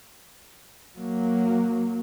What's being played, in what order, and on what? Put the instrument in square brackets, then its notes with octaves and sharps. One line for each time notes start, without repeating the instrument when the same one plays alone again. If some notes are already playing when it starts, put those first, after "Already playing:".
[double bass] F#3 A#3